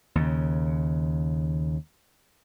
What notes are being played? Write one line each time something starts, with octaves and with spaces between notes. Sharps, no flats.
D#2 C#3